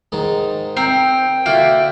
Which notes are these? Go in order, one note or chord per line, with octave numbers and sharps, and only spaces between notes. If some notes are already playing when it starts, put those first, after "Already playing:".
G#2 D#3
C4 A#4 G5
D3 A#3 F#4 E5